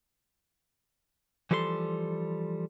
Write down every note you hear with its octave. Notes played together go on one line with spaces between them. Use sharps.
E3 F3 G3 A4 C#5 C6